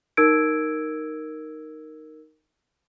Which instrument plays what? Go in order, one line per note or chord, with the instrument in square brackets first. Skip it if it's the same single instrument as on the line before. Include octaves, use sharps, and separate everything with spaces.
[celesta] D#4 A#4 E6 G#6 D7